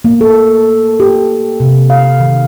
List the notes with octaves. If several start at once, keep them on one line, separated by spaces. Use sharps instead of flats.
A#3
A4
G4
C3
F5
D#3